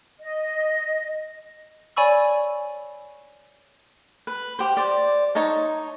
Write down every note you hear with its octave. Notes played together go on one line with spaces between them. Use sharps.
D#5
C#5 D5 G#5 B5 C#6 E6
B4
G4 C5
C5 D5
D#4 C#5 A5